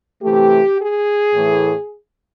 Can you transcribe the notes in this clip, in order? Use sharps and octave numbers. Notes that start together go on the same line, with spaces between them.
C3 E3 A3 G4
G#4
A2 E3 A3